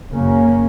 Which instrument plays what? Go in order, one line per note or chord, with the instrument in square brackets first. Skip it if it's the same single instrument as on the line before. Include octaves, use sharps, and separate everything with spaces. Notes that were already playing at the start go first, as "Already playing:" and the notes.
[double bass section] F#2 C#3 A#3 C#4